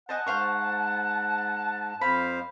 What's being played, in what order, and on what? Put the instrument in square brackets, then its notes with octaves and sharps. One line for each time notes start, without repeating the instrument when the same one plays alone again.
[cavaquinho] C5 D#5 G#5 [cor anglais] F#5 [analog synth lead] A5
[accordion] G#2 [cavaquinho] C5 F5 C#6
[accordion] F2 C5 F5 [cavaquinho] B5